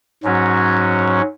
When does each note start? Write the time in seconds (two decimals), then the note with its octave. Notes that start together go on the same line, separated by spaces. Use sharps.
0.23 G#2 F#3 C#4 F#4